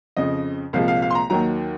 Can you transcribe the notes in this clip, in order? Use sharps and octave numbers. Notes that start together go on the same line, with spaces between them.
F2 C#3 F3 D#5
C2 A#2 F3 G#3 F5
F5
F5
C6
A#5
D#2 D#3 F#3 A#5